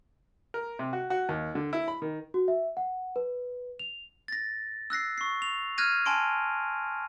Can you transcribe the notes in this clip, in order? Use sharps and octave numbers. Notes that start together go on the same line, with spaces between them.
A#4
C3
F#4
F#4
D#2
D3
E4
B5
D#3
F#4
E5
F#5
B4
F7
A6 A#6
E6 F#6 A#6 C7
C#6 C7
F7
F6 F#6 G#6 A#6 D#7
G#5 A5 C6 D7